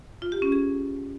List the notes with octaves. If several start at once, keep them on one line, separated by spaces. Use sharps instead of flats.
F4
G4
C#4
G#4